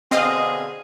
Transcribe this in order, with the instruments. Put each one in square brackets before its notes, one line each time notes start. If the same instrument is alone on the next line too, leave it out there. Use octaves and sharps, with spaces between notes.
[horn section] B2 D3 G#4 [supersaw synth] C4 D#5 F5